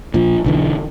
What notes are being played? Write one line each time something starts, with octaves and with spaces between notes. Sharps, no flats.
A#2 F3
B1 D3 E3